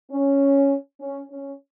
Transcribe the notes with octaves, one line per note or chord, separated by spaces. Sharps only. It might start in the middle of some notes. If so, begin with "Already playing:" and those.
C#4
C#4
C#4